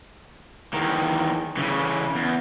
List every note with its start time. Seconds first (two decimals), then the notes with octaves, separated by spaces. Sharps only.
0.74 E2 D#3
1.57 C#3 E3
2.15 E2